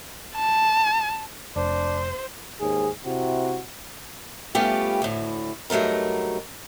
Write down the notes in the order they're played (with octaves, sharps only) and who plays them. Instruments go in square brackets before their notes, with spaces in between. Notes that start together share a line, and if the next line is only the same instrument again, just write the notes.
[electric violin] A5
[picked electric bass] F1 [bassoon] D4 [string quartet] C5
[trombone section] D#2 G#2 G#4
C3 E4 F#4
[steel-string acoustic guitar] G3 A3 B3 C#4 F4 G4
D2 A2
G2 F#3 A3 D#4 A#4